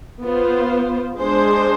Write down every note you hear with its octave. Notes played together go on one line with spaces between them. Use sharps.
B3 F4 C5
G#3 D4 G#4 C5